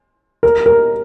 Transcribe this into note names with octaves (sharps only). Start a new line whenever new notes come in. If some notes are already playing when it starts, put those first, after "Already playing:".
A#4
A#4